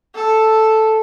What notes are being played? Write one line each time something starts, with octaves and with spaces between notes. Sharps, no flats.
A4